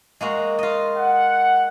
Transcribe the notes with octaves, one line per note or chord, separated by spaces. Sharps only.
G#3 A#3 F#4
F4 D#5
F#5